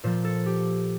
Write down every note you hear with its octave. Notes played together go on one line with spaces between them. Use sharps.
A#2 F3 C5
A4
G4